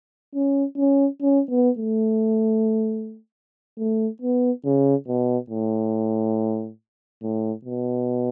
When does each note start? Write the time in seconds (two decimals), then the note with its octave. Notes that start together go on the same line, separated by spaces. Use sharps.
0.35 C#4
0.78 C#4
1.22 C#4
1.50 B3
1.79 A3
3.79 A3
4.22 B3
4.65 C#3
5.08 B2
5.50 A2
7.23 A2
7.65 B2